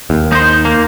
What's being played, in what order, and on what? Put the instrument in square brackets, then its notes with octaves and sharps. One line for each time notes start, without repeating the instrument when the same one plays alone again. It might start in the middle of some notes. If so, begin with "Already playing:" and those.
[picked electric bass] D#2
[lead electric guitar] D#4 C5
A#3